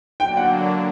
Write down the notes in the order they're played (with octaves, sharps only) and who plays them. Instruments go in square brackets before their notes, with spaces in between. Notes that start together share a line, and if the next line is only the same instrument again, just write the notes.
[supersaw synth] D3 F#3 A#3 D4 [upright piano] G5
[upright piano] F#5